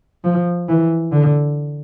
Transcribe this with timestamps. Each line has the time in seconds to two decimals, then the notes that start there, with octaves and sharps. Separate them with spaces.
0.24 F3
0.69 E3
1.12 D3